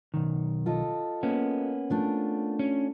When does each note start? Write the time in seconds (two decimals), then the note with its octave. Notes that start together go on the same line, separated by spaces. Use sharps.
0.14 B1 D#3
0.66 F4 A4 D#5
1.23 A#3 B3 C#4
1.90 A3 D4 F4
2.59 C#4